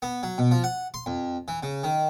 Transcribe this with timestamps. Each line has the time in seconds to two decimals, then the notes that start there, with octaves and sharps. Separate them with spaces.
0.02 B3
0.23 F#3
0.38 B2
0.51 F3
0.64 F#5
0.94 C6
1.06 F2
1.48 E3
1.63 C#3
1.84 D#3